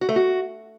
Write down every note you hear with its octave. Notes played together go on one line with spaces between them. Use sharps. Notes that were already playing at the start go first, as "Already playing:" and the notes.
F#4
A3
F#4